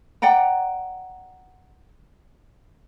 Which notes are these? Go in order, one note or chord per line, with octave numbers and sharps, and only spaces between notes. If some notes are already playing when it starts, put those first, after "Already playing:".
D5 F#5 G5 A#5